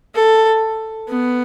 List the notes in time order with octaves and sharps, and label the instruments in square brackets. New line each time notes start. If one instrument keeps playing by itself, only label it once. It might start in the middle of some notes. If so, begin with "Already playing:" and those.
[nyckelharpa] A4
B3